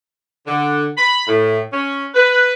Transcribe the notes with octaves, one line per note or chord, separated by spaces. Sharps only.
D3
B5
A2
C#4
B4